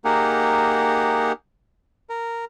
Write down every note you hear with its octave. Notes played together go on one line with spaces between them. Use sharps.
A#3 D#4 G4 G#4 A#4 F#5
A#4